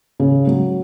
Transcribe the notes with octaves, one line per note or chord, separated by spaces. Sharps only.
C#3
F#3